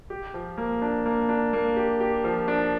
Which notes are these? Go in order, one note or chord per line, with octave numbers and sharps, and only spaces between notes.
G4
F3
A#3
D4
A#3
D4
A#3
G4
G4
F3
D4